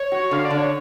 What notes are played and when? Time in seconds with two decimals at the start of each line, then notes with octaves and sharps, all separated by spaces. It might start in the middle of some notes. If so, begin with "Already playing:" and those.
Already playing: C#5
0.12 F#4
0.31 D3 F5
0.45 D5
0.51 D3
0.57 C#5